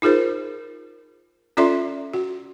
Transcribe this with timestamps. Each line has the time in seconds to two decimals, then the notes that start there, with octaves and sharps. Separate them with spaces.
0.02 D#4 F4 G#4 A#4 C5
1.57 C#4 F4 A4 D5 E5 C6
2.14 F#4